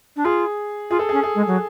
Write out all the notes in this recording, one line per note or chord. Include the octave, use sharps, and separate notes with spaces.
D4
F4 G#4
F4 G#4
A4
C#4 G#4
G#4
G#3
F#3